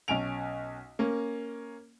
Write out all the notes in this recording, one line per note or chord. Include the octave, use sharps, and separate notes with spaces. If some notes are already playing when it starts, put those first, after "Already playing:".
B1 C#4 G#5 D7 F7
A#3 C#4